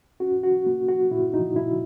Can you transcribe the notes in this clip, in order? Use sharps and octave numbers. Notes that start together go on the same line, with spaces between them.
C#4 F#4
F#4
A#3
F#4
A#2 E4
D#4
A#2 E4